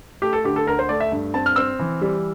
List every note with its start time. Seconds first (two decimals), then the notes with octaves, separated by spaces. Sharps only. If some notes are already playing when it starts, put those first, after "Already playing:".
0.22 A3 G4
0.33 A4
0.44 D3 G4
0.56 A4
0.67 D2 A#4
0.79 C5
0.89 A3 D5
1.00 E5
1.12 G2
1.34 C4 A5
1.46 F6
1.56 C4 E6
1.79 E3
2.02 G3